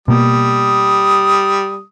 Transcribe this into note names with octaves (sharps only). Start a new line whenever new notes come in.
B2 G3 A#3 D#6